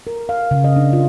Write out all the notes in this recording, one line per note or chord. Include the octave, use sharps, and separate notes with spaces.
A#4
F5
C#3
D#5
D4
F4